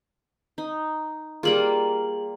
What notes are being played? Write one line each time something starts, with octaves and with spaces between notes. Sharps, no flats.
D#4
G3 A#3 F4 G#4 F#7